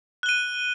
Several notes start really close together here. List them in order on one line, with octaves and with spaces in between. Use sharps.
F#6 G7 D#7